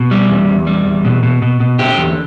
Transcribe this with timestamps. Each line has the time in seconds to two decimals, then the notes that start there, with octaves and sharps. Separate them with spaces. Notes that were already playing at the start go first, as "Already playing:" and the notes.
Already playing: B2
0.11 G3
0.30 E2
0.49 E2
0.67 G3
0.86 E2
1.05 B2
1.23 B2
1.42 B2
1.60 B2
1.79 D3 G4
1.98 E2